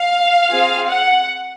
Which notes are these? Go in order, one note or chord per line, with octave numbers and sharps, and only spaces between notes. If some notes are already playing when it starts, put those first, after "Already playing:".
Already playing: F5
C4 F4 G#4
F#5